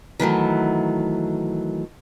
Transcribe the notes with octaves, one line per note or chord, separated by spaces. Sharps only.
D#3 E3 F#3 A3